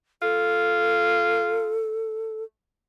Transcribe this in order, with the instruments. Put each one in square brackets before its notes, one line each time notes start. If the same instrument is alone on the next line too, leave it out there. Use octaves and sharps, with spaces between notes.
[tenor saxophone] F4 [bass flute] A4